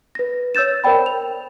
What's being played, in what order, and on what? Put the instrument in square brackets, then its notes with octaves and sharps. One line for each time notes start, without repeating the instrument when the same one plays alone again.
[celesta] B4 A#6
C#5 E6 G6 A6 E7
A#4 C5 D5 G5 B5
F7